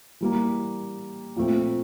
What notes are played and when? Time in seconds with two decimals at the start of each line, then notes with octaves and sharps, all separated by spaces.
0.21 E3 G3 A#3
1.36 A#2 F3 A3 C4